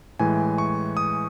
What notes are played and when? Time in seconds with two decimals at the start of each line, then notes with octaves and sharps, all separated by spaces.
0.19 A2 E3 G#3 G#5
0.58 C#6
0.97 D#6